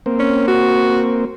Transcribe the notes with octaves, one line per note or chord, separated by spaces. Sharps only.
A#3 C4
C#4
F#4